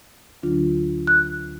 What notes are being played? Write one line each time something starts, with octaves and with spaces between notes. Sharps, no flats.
D2 D3 F#3 D4 F4
F#6